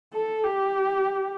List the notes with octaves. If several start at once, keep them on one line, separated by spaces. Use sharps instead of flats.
A4
G4